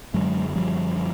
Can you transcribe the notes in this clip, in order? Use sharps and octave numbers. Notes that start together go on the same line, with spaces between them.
F#2 D3 F#3 G#3
F3 G3